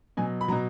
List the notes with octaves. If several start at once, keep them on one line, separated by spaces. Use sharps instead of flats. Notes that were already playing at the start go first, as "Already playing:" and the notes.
B2 F#3 G#5
B5
B2 F#3 A#5